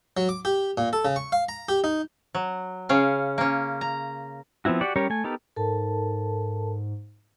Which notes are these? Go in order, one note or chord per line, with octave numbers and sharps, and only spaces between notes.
F#3
D6
G4
A#2
A4
C#3
C#6
F5
A#5
G4
D#4
F#3
C#3 C#4 F5
A#3 C#4
A#5
F3 B3 C4 E4 F#4
F#4 G4 D5 F#5
G3 C#4 G4 A#4 C#5
A3 G#5
B3 D#4 G4 A4 A#4
G#2 A4 A#4 A5